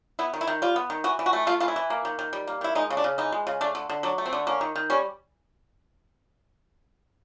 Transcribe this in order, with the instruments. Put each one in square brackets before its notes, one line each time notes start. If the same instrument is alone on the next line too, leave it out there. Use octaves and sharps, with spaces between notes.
[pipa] B3 E4
D#3
E4
D#3
G3 F4
B3
D#3
E3 F#4
E3
F#4
A3
A3 F4
E3 F4
E4
E3
A#3
D#3
D#3
G3
A#3
D#3 E4
G#3 D#4
C#3
D4
C#3
E3 D#4
G#3
C#3
A3 D4
D3
D3
F#3 D4
A3
C4
D3
A#3 C#4
D#3
D#3
G3 C#4